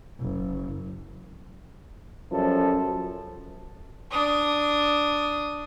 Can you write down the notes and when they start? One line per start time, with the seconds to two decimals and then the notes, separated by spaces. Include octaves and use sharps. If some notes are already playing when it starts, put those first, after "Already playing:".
0.20 F#1
2.31 F#2 F3 G3 A4
4.11 D4 D#6